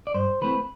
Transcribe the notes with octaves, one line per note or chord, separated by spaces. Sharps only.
D5
G2 C5
E3 A3 C4 B4